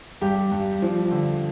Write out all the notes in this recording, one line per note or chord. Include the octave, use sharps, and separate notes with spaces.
G2 G4
G2
F3
D3